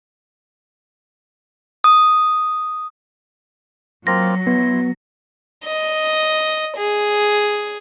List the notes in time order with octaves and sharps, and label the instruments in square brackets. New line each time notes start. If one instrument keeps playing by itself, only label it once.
[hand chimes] D#6
[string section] F#3 [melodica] A#3 C4 F4 [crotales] A#6
[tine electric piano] B3 [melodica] E4 C6
[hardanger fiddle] D#5
G#4